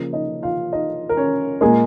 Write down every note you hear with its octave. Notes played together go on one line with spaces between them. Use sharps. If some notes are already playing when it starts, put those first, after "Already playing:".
Already playing: C#3 F3 A#3
D#4 D#5
F4 F5
D#4 D#5
A#4
C#4 C#5
A#2 G#3 A#3 G#4